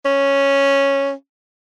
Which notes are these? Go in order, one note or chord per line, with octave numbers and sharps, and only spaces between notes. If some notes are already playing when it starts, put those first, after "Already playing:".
C#4